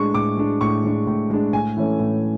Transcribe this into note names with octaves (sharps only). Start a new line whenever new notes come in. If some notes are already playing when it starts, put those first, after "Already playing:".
Already playing: A2 G#3 D4 C#6
A2 D6
G#3 D4
A2 C#6
G#3 D4
A2
G#3 D4
A2 G#5
E3 A3 C#4
A2